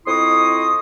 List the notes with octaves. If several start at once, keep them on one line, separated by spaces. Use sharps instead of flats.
F2 E4 D#5 C6 C#6 D#6